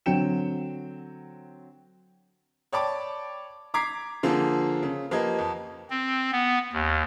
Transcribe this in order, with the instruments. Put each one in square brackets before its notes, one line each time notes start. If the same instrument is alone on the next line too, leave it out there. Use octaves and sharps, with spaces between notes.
[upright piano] D3 F#3 C4 G5 C#7 E7
C#5 D5 G5 A5 B5 D6
A#5 D6 G#6 B6 C7
D3 F3 A#3 F4 G#4
C#3
F3 A#3 G4 B4 D#5 G#6
F2
[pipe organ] C4
B3
D#2